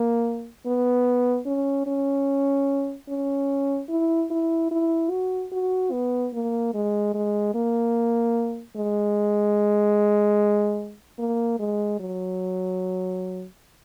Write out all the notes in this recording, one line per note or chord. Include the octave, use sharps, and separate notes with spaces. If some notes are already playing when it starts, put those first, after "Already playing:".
Already playing: A#3
B3
C#4
C#4
C#4
E4
E4
E4
F#4
F#4
B3
A#3
G#3
G#3
A#3
G#3
A#3
G#3
F#3